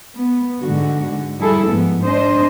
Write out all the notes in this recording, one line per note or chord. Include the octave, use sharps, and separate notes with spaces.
B3
G#2 D3 F#4
G3 E4 G#4 A4
G#2 F3 B3
D4 C5 D#5